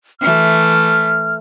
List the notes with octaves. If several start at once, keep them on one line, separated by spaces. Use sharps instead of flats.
E3 A3 F6